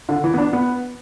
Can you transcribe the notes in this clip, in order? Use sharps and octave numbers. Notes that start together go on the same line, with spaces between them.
D3
E3
B3
D4
B3